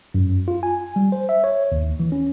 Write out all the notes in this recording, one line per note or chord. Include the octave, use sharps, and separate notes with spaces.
F#2
F4
G#5
G3
C5
E5
C#5
D#2
E3
C#4